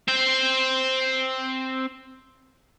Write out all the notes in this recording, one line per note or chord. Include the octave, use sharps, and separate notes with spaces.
C4 C5